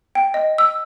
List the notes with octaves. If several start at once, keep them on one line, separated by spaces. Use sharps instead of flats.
G5
D#5
E6